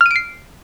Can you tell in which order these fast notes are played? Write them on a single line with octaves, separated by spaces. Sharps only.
F6 D#7 D7 C7